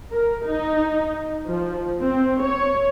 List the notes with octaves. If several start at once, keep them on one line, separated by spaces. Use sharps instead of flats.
A#4
D#4
F3
C4
C#5